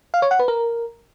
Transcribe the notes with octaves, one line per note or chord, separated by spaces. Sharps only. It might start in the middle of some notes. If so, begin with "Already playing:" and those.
F5
C#5
F#5
B4
A#4